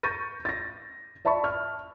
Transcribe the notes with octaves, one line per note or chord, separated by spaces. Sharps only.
C#6 G6 A6 A#6 D#7
A6 A#6
D5 E5 A5 B5 C#6
F6